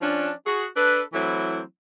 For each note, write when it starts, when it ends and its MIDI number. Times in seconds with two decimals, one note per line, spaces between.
0.01 0.31 53
0.01 0.31 61
0.01 0.31 62
0.45 0.65 66
0.45 0.65 68
0.76 1.00 62
0.76 1.00 69
0.76 1.00 71
1.13 1.60 52
1.13 1.60 54
1.13 1.60 57
1.13 1.60 60
1.13 1.60 64